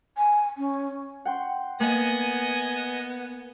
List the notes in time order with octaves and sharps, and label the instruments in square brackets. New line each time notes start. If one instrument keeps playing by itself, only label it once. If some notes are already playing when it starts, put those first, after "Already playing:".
[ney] G#5
C#4
[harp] F#5 G5 C6
[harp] A#3 [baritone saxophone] B3 [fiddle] D#5 G#5